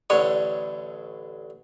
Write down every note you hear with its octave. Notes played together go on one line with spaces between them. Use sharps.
A1 D3 D4 C#5